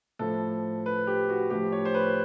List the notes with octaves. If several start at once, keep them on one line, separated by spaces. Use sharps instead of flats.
A2 F3 A4
B4
G4
F#4
A2 F3 G4
C#5
C5
B4